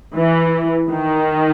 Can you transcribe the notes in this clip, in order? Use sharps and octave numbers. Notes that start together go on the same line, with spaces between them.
E3
D#3